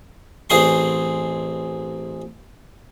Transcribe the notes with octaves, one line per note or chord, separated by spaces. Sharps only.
A1 C4 G#4 C6 C#6